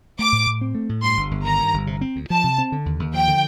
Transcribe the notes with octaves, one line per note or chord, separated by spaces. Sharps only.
A3 D6
A2
A2
C4
A3
A2
G2 C6
G1
G1
D#3 A#5
G2
G1
C3
C4
D2
F3 A5
C3
C4
D3
D#2
D#2
F3 G5
D3